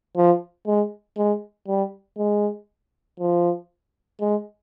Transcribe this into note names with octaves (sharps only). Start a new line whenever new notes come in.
F3
G#3
G#3
G3
G#3
F3
G#3